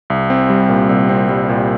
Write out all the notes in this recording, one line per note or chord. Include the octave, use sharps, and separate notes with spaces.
C2
C4
G3
A#2
C2
C4
G3
A#2